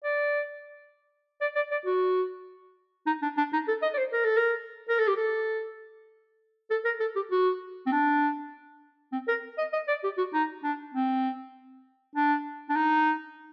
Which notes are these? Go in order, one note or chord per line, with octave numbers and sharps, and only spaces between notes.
D5
D5
D5
D5
F#4
D#4
D4
D4
D#4
A4
D#5
D5
C5
A#4
A4
A#4
A#4
A4
G4
A4
A4
A#4
A4
G4
F#4
C4
D4
C4
A#4
D#5
D#5
D5
G4
F#4
D#4
D4
C4
D4
D4
D#4